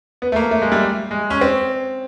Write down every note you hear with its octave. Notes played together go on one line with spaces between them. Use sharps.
B3
A3
A#3
A3
G#3
G3
G#3
C#4
C4